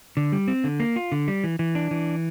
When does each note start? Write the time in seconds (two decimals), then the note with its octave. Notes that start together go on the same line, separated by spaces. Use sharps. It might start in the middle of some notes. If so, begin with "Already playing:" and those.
0.17 D3
0.32 G3
0.48 C4
0.64 D3
0.80 A#3
0.96 F4
1.12 D3
1.28 G3
1.44 E3
1.59 E3
1.75 D4
1.91 E3